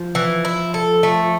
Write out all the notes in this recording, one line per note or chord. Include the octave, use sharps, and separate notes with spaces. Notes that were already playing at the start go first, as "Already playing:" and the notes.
Already playing: F3
E3
E4
A4
A3